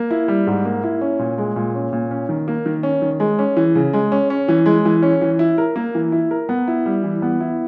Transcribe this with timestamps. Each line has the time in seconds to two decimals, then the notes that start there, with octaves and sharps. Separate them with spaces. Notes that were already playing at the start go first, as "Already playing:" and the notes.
Already playing: A#3
0.11 E4
0.28 G3
0.47 G#2
0.65 A#3
0.84 E4
1.01 C#4
1.19 A#2
1.38 G#3
1.56 A#2
1.75 C#4
1.93 A#2
2.11 C#4
2.29 D#3
2.48 A#3
2.66 D#3
2.83 C#4
3.02 D#3
3.20 G#3
3.39 C#4
3.57 E3
3.75 C#3
3.93 G#3
4.12 C#4
4.30 C#4
4.48 E3
4.66 G#3
4.85 E3
5.03 C#4
5.21 E3
5.39 E4
5.58 A#4
5.76 A#3
5.95 E3
6.12 E4
6.31 A#4
6.49 B3
6.68 E4
6.86 G3
7.04 E3
7.22 B3
7.41 E4